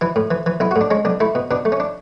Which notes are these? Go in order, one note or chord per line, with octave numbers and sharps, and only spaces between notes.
E3 E4
A2
E3
E3
B1 E4
F#4
A2
D4
G#3 C#4
B1 D4
A3 E4
B2
B2 D4
A3
C#4
D4